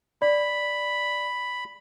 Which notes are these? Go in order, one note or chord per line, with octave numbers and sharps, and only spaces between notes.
D5 B5